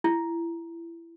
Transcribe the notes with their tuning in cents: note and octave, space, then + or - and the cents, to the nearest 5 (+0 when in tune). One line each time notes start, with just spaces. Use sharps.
E4 +25